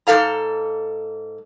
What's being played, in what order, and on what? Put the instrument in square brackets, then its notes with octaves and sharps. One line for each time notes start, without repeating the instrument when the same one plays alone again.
[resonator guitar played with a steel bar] G#2 C#3 A4 F5 A#5